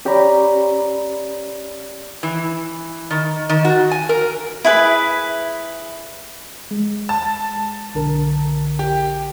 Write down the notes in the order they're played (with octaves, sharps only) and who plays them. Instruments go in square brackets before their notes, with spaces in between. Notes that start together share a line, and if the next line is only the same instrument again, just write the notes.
[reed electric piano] C#4 G4 C#5 D5 A#5 B5
[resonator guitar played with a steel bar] E3
D#3
D#3
F#4
G#5
A#4
[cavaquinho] E4 G#4 B4
[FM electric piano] G#3
[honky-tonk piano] A5
[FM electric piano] B1 D3 A#4
[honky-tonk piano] G4